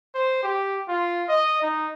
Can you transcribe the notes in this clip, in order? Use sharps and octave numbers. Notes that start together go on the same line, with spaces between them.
C5
G4
F4
D#5
D#4